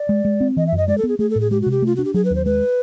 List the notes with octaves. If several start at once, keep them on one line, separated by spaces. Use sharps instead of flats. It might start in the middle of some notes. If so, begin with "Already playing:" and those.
Already playing: D5
G#3
G#3
C4
E3 D#5
E5
F#2 D#5
G#3 D5
A4
B3 G#4
A3 G#4
A4
A2
G#4
G#3 G4
F#4
C3
G4
A3 F4
D4 F#4
G4
F#3 G#4
B4
D#2
C5
G#3 B4